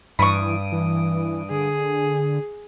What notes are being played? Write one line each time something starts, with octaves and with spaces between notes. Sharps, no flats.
G2 E3 B5 C#6 D#6 D7
E3
D3 G#4